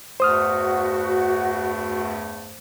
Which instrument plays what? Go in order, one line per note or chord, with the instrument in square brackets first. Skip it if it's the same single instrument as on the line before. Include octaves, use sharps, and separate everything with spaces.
[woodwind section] E2 G2 A3 [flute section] F#4 [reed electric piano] C5 D#6 F6